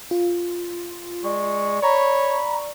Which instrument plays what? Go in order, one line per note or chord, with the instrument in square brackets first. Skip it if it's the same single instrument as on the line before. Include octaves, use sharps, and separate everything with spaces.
[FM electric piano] F4
[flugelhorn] G#3 [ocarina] D5 [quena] C#6
[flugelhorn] C#5 [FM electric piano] A#5 C#6 [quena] B5